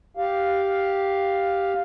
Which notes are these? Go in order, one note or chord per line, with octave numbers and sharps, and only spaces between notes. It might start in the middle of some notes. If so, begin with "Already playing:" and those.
G4 F5